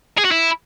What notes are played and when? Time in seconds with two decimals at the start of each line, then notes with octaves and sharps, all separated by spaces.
0.18 G#4
0.24 F#4
0.31 E4